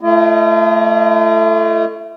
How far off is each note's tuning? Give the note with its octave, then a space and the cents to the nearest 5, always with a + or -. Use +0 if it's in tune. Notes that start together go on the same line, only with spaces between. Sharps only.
A3 +0 F4 -45 D#5 +0